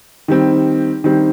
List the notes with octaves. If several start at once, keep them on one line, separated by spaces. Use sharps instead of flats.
D#3 G3 C4
D#3 G3 C4